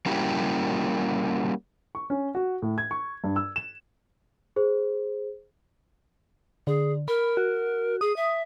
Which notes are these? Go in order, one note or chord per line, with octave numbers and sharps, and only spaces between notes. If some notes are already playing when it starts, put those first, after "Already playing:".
G3 A#3 C#4 E4 F#4 G4
C#6
C#4
F#4
A2
G#6
C#6
G2
E6
E7
G#4 C5
D3 G#4
A#4 B5
F#4
G#4 D#6
E5